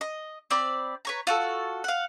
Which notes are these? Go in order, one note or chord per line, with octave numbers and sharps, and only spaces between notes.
D#5
C4 D5 B5
B4 C#5 A#5
F4 F#4 A4
F5 F#5